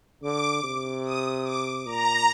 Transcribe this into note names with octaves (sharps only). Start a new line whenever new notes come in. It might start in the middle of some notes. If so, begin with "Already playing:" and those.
D3 D6
C3
D#6
D6
A#2 A#5